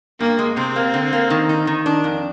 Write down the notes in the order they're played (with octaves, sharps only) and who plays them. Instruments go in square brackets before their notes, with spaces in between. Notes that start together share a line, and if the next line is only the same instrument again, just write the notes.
[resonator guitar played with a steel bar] G2 [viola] A#3
[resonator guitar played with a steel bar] G#3
[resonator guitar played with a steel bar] C3 [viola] C4
[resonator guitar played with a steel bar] A#3
D3
A#3
D#3
D#4
D#3
D4
F2